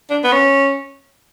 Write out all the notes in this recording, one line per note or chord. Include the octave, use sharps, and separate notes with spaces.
D4
B3
C#4